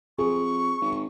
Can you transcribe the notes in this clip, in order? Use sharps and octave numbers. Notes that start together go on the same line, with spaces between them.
F2 G#4 C#6
G#1